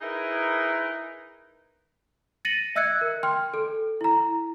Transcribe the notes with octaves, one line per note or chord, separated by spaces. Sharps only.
D#4 E4 G#4 A#4 B4
A6 A#6 C#7 D#7 F#7
D#5 E5 E6 F#6 G#6 C#7
A#4
G5 C6 F6
A4
E4 A#5